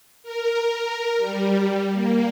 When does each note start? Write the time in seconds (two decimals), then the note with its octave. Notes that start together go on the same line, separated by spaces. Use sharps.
0.23 A#4
1.18 G3
1.92 A#3